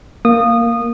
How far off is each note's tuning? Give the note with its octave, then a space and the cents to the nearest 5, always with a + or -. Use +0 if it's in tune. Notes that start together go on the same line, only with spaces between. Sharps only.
A#3 +0 D#6 -20